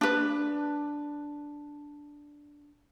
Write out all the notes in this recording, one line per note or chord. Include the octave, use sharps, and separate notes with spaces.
D4 B4